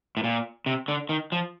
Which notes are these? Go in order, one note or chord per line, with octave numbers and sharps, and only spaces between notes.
A2
A#2
C3
D3
D#3
F3